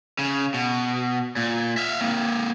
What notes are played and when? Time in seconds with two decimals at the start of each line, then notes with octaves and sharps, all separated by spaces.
0.19 C#3
0.54 B2
1.36 A#2
1.77 E5 F5
2.01 A#3 C4